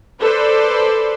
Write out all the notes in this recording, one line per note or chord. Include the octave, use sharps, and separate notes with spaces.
A4 B4 C5 D5